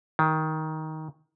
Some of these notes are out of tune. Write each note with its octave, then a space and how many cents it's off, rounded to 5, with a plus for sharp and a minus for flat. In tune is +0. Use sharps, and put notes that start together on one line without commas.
D#3 +15